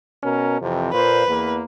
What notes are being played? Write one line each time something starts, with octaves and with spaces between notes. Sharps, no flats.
B2 C#4 A#4
F2 C3 E3
A#2 B4 C5
E2 A#3